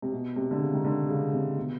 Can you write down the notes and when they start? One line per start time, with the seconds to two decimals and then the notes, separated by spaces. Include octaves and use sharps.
0.02 C3
0.12 B2
0.36 C3
0.51 D3
0.60 C#3
0.73 D#3
0.85 D3
1.09 C#3
1.33 C3
1.57 B2